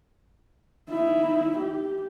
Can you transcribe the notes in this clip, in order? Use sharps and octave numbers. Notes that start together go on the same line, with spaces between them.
D#4 E4
G4